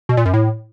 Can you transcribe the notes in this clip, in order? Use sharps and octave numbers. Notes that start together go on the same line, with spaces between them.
B2
A#2
F#2
A2